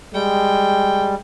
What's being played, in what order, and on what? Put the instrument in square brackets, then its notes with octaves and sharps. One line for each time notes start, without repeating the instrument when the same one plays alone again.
[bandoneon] G3 [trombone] G#3 [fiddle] G5